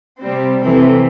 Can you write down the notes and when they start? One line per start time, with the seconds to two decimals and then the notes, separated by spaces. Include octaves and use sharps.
0.19 C3 G3 C4
0.60 C3 E3 A3 C4